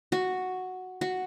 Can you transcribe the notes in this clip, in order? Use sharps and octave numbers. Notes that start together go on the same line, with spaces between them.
F#4
F#4